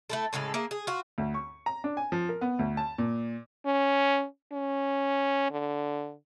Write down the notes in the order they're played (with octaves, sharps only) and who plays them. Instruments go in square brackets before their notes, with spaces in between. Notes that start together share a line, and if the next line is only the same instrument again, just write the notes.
[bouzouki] A3 E4 A4
A2 C#3 G#3 A4
A#3 G#4 E5
G#4
F4 F#4
[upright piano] D2
C#6
A#5
D4
G#5
F3
A#4
B3
D2
A5
A#2
[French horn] C#4
C#4
D3